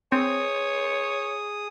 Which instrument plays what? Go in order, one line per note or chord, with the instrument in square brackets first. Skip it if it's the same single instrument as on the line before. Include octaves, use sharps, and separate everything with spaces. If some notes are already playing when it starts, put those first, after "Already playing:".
[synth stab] C4 [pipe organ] G#4 D#6 [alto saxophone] C#5